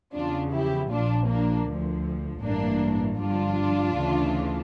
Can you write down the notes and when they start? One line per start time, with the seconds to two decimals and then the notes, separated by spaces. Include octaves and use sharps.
0.15 E2 C#3 F3 D4 F4
0.54 E4 G4
0.92 A#1 A#2 F3 D4 F4
1.29 A#3 D4
1.68 D2 D3 F3
2.44 A1 G2 E3 A#3 D4
3.19 G1 G2 F3 D4 F4
3.96 D2 C#3 E3